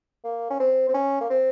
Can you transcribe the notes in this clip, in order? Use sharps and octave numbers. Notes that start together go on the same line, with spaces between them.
A#3
C#4
C4
C4
C#4
A#3
C4